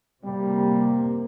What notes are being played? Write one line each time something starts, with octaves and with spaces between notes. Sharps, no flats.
C3 G3 A#3